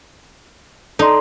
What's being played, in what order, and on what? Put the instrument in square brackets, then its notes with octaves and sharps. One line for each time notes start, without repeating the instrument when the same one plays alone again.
[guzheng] D#4 [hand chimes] A4 D5 C6